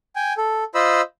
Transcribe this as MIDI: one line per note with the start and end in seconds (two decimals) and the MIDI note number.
0.16 0.33 79
0.16 0.33 80
0.37 0.64 69
0.75 1.01 65
0.75 1.01 72
0.75 1.01 75
0.75 1.01 83
0.75 1.01 88